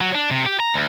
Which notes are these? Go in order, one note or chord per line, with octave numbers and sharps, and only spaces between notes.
F#3
D4
C3
G4
A#5
D2